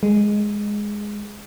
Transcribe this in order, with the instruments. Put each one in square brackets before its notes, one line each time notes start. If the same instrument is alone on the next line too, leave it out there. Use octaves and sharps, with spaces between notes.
[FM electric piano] G#3